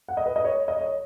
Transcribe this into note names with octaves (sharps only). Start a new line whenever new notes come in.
F#5
D#5
B4
D#5
C#5
D#5
C#5